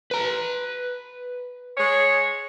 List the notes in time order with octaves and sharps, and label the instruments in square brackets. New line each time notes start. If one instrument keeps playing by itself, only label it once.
[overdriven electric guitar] B4 A#5
[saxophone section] G#3 G#4 C#5